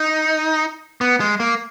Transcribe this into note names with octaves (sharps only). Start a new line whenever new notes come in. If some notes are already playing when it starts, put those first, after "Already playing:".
Already playing: D#4
B3
G#3
A#3